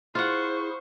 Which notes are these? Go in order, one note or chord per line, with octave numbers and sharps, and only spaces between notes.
E4 F4 G#4 C5 F#5 C#6